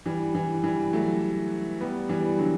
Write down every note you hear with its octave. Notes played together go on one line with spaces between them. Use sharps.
E3 G3
E3
E3 G3
F#3 A3
G3 B3
E3 G3
D3 F#3